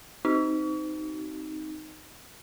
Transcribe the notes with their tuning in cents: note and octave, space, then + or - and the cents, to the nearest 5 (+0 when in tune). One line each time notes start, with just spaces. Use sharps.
C4 +0 D#4 +0 F#4 +45